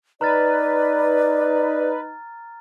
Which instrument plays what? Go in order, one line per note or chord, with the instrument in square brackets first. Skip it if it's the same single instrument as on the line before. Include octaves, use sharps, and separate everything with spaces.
[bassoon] D#4 [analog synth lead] B4 [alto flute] D5 [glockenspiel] A#5 F6 A6